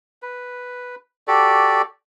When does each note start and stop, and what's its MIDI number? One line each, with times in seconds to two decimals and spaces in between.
0.22 0.95 71
1.28 1.82 66
1.28 1.82 67
1.28 1.82 69
1.28 1.82 74